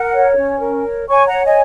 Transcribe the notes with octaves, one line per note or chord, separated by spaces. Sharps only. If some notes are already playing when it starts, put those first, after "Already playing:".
Already playing: A#4 F#5
C#5
C#4
A#4
C#5
C#5 G#5 C#6
F#5 A#5
C#5
D#5 G#5